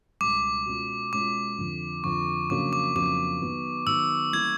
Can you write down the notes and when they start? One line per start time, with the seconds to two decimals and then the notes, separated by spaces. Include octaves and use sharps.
0.21 C#2 B2 G3 D6
0.66 B2 G#3 C#4 F4
1.12 B2 G#3 C#4 F4 D6
1.57 F2 D3 F3
2.04 F2 D3 F3 C#6
2.50 F2 C#3 F#3 A#3 D4 D6
2.73 D6
2.95 F2 C#3 F#3 A#3 D4 D6
3.42 D#3 F#3 B3
3.87 D#3 F#3 B3 E6
4.33 E3 G3 A#3 C#4 E4 G#6